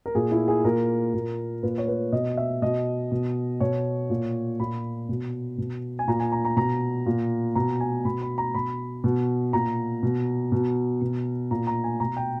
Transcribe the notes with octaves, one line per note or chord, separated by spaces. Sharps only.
A#4
A#2 G#4
E4
G#4
A#2 A#4
A#2
A#2 B4
C#5
B4
B2 D#5
E5
B2 D#5
B2
B2 C#5
A#2
A#2 B5
B2
B2
G#5
A#2 A#5
G#5
A#5
A#5
B2 A#5
A#2
B2 A#5
G#5
B2 B5
B5
A#5
B2 B5
B2
A#2 A#5
B2
B2
B2
A#2 A#5
A#5
G#5
B2 A#5
G5